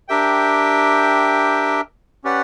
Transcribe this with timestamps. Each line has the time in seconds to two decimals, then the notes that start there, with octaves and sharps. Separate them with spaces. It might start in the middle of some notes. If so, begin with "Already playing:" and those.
0.08 D4 G4 A#4 E5 G5
2.24 C#4 G4 B4 D5 F#5